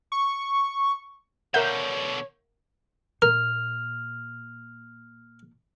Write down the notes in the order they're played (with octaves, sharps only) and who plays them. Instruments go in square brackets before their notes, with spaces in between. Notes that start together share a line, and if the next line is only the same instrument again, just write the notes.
[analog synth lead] C#6
[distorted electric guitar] B2 D3 [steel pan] A#4 E5 F#5 [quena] C#5 [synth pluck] G6
[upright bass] A#2 [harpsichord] A#4 [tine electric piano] F6